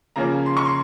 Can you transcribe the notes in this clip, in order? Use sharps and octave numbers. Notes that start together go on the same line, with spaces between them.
C#3 F3 A#3 C#4 A#5
C6
C#6
C6